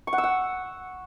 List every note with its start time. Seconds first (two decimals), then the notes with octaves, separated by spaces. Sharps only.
0.07 C#6
0.13 F#5
0.18 E6
0.24 F#5